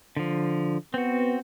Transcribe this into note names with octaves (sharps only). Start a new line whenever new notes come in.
D3 F3
B3 C4 F#4